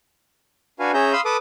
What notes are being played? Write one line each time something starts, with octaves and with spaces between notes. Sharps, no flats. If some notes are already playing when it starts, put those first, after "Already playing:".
D4 F#4 B4 F5 G#5
C#4 G#4 E5 A#5 G6
F5 B5 C6 D#6 E6
A4 B4 D6 D#6